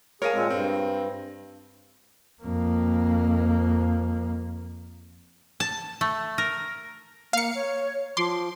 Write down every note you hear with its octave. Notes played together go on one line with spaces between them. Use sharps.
G#4 A#4 C#5 F5 A5 A#6 D#7
A#2 G#3 C4
G2 C4
F2 A#3
A5
A3
A#4
A#3 F5 C#7
C#5
F3 C6 D6